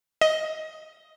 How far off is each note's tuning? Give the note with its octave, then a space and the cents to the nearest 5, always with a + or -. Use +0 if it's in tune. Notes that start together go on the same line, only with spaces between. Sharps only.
D#5 +10